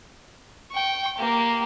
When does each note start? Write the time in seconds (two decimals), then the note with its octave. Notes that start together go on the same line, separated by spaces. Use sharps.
0.72 G5 C#6
1.18 A#3 G4